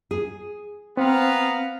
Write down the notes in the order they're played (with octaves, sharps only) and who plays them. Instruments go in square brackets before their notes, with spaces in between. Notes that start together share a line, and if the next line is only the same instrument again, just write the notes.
[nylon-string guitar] G#4
[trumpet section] B3 F5 A#5 [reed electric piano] C4